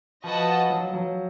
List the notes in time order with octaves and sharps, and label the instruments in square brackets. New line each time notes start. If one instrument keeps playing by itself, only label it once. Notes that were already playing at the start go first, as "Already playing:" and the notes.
[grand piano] F3 [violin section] F#4 B4 D#5 F#5 A5
[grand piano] F#3
F#3